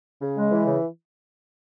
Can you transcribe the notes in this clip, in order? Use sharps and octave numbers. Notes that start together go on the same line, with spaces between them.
C#3
G#3
E3
C#3